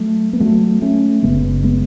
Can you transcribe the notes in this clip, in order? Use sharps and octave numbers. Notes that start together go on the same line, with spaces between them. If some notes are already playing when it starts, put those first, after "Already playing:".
Already playing: F#3 A3
B3
F#3 A3
A3 C#4
F#1 E2 C#3 G#3 B3
G#3 B3